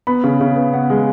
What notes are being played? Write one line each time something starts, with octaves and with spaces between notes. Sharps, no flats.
B3 B5
C#3
C#3
B3
B3 F#5
G#3